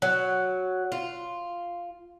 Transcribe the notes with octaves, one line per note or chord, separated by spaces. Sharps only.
F#3
F4